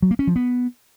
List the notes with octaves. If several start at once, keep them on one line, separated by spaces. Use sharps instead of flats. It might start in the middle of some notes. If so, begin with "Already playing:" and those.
F#3
A#3
C#4
F3
B3